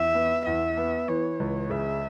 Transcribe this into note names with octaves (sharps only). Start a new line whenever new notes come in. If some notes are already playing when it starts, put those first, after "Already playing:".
Already playing: E2 E5
B3
E2 E5
B3
E3 C#5
C#2
C#3 E5